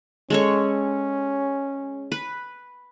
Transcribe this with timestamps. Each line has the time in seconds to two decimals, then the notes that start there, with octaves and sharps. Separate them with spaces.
0.30 G#3 C#4 A4 C#5
2.12 B4